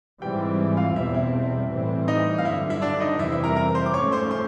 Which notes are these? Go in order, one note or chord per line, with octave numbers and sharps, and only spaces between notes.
G#2 E3 G3 C4 G4 G5
F4 F5
E2 B2 G3 C4 E4 E5
E4 E5
A2 E3 G3 C4
D#4 D#5
F5
G2 D3 F#3 E4 E5
E4 E5
D4 D5
D#4 D#5
F2 C3 E3 G3 C4 E4 E5
E4 E5
A#4 A#5
A#4 A#5
C5 C6
D6
G#2 F3 A3 C#4 C#5 C#6
C5 C6
C5 C6